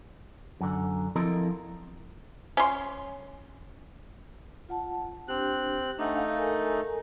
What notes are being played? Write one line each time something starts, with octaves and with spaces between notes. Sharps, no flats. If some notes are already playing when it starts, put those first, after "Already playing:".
F#2 D3
F3 C4 E4 A4 A#4 D#5
C#4 C6
F4 F#5 A5
C4 D4 G4 F#6
A3 D4 D#4 F#5 G#5
F5
A4 A#4 G#5